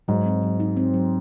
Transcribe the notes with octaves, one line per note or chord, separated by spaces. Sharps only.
G#2 F#3
C4
F#3
D#4
C4
F#3